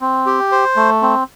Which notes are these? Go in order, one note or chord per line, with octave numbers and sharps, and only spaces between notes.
C4
G4
C5
A3
C4